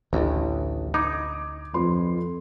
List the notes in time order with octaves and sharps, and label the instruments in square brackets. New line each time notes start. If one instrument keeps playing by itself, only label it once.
[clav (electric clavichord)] A1 [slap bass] D2
[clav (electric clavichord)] D#4 [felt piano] D6 G#6
[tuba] F2 [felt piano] F4 B4 C6